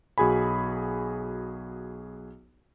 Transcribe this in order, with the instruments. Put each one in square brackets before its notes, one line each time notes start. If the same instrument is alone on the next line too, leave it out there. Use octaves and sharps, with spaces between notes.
[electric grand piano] B1 F#4 G#4 G#5 B5